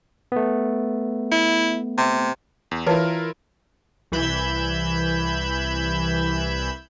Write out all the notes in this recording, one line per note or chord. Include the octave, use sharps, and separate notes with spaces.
A3 B3
E4
C3
E2
E3 E4 F4 A#4 B4 A5
C2 E3 B5 G6 G#6 E7